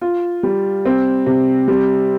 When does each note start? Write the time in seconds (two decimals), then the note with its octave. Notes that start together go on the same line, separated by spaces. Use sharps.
0.01 F4
0.43 G3
0.85 C4
1.26 C3
1.68 G3